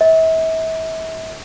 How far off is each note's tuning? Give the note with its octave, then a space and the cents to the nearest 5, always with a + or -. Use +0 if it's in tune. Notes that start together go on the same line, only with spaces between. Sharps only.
E5 -35